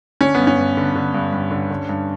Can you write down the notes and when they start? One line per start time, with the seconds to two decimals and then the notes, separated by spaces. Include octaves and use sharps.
0.21 D3 C#4
0.35 G2 B3
0.47 C#4
0.58 G2
0.77 D3
0.95 D3
1.14 G2
1.32 G2
1.51 D3
1.70 D3
1.89 G2